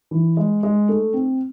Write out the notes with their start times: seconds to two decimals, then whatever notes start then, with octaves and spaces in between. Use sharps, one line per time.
0.11 E3
0.37 G#3
0.63 G#3
0.89 A3
1.14 C4